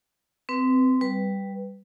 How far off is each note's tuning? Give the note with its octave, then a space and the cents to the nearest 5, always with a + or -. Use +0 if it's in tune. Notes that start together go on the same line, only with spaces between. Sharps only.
C4 -20 B4 +0
G3 +0 B4 +0